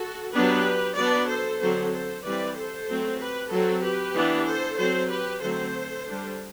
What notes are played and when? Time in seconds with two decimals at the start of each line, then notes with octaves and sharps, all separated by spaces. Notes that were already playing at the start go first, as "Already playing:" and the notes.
Already playing: F#4 A4
0.34 F#3 B3 D4 G4 B4
0.97 F#3 B3 D4 B4 D5
1.29 A4 C5
1.61 D3 F#3 C4 A4 C5
1.93 A4 C5
2.24 E3 G3 C4 B4 D5
2.56 A4 C5
2.89 F#3 A3 C4
3.19 G4 B4
3.51 F#3 C4 F#4 A4
3.83 G4 B4
4.15 E3 B3 D4
4.47 A4 C5
4.78 F#3 C4 A4 C5
5.10 G4 B4
5.42 D3 F#3 A3 C4 A4 C5
6.06 G3 D4